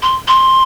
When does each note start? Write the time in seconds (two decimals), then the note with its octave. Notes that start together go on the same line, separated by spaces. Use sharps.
0.02 C6
0.28 C6